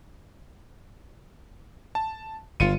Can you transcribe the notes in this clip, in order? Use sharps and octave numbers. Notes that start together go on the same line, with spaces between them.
A5
G1 F4 C#7 D#7